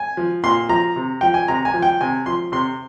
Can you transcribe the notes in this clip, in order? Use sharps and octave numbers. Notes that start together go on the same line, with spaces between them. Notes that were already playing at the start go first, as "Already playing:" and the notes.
Already playing: G#5
F3
A#2 C6
F3 A#5
C3
F3 G5
G#5
C3 A#5
G#5
F3
G5
C3 G#5
F3 C6
C3 C6